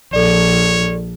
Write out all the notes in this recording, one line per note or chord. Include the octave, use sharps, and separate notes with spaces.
A#1 F3 A4 C#5 D5